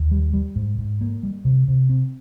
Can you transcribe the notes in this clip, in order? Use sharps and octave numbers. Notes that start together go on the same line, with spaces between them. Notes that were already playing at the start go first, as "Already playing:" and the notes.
Already playing: D#2
G3
G3
G#2
G#2
A#3
G3
C3
C3
C4